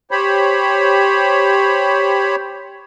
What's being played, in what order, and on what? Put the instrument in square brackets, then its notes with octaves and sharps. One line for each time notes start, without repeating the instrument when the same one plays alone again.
[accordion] G4 C5 C#5 B5